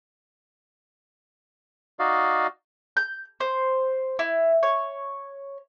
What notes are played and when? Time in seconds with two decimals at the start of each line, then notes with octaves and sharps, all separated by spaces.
1.99 D#4 F#4 D5 D#5 F5
2.97 G6
3.40 C5
4.19 E4
4.63 C#5